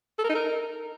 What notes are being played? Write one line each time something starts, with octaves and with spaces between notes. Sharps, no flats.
A4
A#4
D#4
A#4